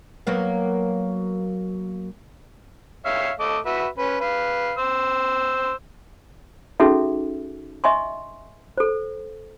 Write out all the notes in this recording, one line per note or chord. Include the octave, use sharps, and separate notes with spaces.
F#3 A#3 B3
C#5 E5 F5
A3 D#5 D6
F#4 B4 E5
C#4 B4
B4 F5
C5 E6
C#4 D#4 F#4 G#4 A4 E5
D#5 E5 G#5 C6 C#6
A4 C5